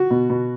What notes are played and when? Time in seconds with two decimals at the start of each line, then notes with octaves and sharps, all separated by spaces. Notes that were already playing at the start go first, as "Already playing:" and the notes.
Already playing: F#4
0.10 B2
0.30 B2